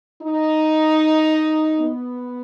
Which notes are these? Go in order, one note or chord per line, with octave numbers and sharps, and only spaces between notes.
D#4
B3